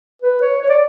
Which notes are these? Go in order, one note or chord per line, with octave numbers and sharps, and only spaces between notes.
B4
C#5
C#5
D5